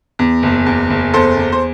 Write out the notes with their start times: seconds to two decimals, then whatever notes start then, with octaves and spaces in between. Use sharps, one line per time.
0.19 E2
0.43 F#1
0.66 E2
0.90 F#1
1.14 E2 A4 C5
1.37 E2
1.52 C5